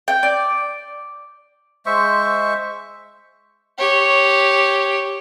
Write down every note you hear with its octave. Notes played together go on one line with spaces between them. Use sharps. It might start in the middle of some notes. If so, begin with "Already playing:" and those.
G5
D5
G#3 C5 E5 C#6
G4 C#5